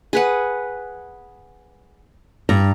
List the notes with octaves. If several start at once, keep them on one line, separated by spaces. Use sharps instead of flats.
G#4 B4 F#5
G2 A#5